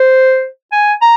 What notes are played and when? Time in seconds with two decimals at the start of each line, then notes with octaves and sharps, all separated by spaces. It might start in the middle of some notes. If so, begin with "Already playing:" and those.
Already playing: C5
0.72 G#5
1.01 A#5